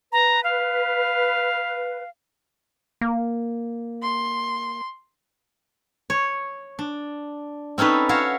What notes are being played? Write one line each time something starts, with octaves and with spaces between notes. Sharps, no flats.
B4 A#5
F5
A#3
C6
C#5
D4
C4 C#4 D#4 A4 B4
F#4 C#5 E5 F5